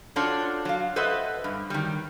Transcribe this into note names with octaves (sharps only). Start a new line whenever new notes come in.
D4 F4 F#4 A4 C5 C#5
F#3 F5
A4 B4 C5 D#5 E5 F#5
G2
D#3 F#3 G3